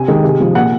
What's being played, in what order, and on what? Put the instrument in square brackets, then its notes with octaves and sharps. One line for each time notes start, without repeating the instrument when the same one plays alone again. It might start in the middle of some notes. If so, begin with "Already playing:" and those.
Already playing: [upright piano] C3 G#5
D#3 G#3
C3
F3 G#3
A#2 F#5